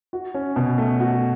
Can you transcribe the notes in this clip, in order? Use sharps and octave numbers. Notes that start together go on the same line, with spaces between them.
F#4
C#4
B2
A3
F#4